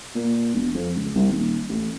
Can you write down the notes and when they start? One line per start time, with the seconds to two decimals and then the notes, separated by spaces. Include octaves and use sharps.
0.15 A#2
0.54 E1
0.74 F2
0.96 C#2
1.16 C2
1.30 D#1
1.69 A1